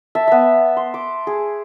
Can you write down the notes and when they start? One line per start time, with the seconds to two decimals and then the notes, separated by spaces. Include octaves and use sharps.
0.15 E5 A5
0.28 B3 E5
0.77 C6
0.94 D6
1.27 G#4